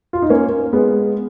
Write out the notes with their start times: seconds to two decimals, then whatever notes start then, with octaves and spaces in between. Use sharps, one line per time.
0.13 F4
0.22 D#4
0.30 A#3 C#4
0.73 G#3 B3